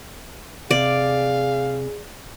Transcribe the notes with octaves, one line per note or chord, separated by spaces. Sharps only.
C3 G#4 D5 F5